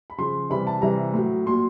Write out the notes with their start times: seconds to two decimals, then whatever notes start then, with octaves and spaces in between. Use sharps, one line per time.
0.10 B5
0.18 C#3 F3 C6
0.50 C3 E3 G3 B5
0.67 A5
0.82 C3 E3 G3 A#5
1.14 A2 F#3
1.46 A#2 F#3 C6